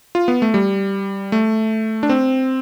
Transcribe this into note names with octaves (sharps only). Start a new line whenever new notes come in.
F4
B3
A3
G3
A3
D4
C4